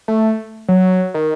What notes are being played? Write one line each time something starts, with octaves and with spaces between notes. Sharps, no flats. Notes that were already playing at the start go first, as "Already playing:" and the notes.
A3
F#3
D#3